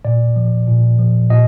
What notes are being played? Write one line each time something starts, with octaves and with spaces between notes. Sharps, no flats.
A#2 D5
F3
A#2
F3
A#2 D#5